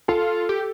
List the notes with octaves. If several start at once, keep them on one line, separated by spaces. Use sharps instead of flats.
F4 A4
G4